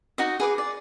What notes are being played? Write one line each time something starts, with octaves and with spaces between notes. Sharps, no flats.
D#4 F#4 D#5
G#4 B4 D6
D5